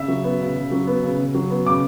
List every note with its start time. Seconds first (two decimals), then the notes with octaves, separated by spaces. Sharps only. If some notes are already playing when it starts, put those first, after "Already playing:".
Already playing: C#3 E5
0.08 F#3
0.24 B3
0.40 C#3
0.56 C#3
0.72 F#3
0.87 B3
1.03 C#3
1.19 C#3
1.35 F#3
1.50 B3
1.66 C#3 D6